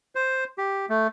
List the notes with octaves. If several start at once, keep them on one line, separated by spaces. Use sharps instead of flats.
C5
G4
A3